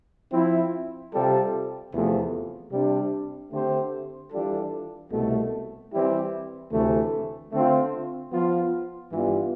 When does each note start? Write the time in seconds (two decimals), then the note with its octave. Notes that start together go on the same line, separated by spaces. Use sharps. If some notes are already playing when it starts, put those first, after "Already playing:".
0.32 F3 C4 E4
1.12 C3 G3 C4 F4 A4
1.92 E2 C3 F3 A3
2.72 C3 G3 D4
3.52 D3 A3 C4 G4 C5
4.32 E3 G3 D4 F4 A4
5.11 C2 B2 A3
5.92 E3 G3 C4 E4 G4
6.71 D2 C3 E3 A3
7.52 D3 A3 C4 F4 C5
8.31 F3 B3 F4
9.12 G2 E3 G3 B3 F4